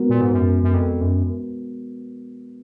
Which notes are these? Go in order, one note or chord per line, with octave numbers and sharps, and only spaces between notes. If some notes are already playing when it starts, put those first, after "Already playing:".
Already playing: F3 G#3 B3 F#4 A#4
A#2
G#2
F#2
F#2
F2
F#2